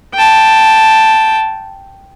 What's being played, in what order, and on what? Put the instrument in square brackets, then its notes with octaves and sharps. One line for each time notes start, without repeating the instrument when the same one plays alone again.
[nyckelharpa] G5 A5